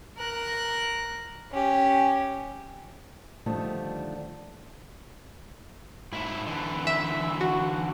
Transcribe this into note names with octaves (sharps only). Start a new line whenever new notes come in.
A#4 F#6
C#4 G4
D3 D#3 F3 G3 A3
G#2 E4
D3 E3
E5
F#4